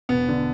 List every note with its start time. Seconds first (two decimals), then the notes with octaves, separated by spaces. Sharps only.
0.09 E1 B3
0.28 D3